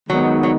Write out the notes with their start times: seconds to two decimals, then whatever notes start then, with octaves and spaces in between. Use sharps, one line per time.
0.10 D#3 F#3 G#3 B3 D#4
0.43 F#3